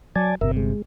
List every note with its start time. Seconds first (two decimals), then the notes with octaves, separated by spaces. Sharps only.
0.16 F#3 D5 G#5 A5
0.41 G1 C3 A#4 E5
0.57 G#3